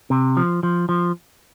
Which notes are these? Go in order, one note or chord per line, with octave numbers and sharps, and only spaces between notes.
C3
F3
F3
F3